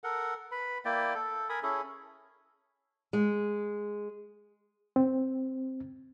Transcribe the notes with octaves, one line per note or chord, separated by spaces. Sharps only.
A4 A#4 F#5
B4 B5
A#3 E4 D5 G5
A4
A#4 G#5 B5 D#6
C#4 E4 G#4 A4
G#3
C4